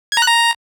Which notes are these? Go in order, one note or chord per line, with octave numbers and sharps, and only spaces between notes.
G#6
A#5
F#6
A#5